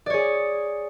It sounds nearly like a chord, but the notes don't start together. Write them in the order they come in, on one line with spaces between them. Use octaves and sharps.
D5 C#5 G#4